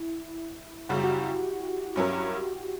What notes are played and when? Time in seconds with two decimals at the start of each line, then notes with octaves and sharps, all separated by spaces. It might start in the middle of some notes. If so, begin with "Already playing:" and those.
Already playing: E4
0.89 F#2 C#3 G3 F#4
0.97 G4
1.04 F#4
1.96 G2 F#3 C#4 E4 A#4